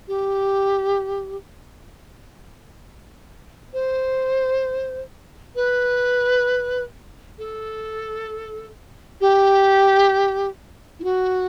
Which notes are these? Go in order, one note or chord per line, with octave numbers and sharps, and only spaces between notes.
G4
C5
B4
A4
G4
E4
F#4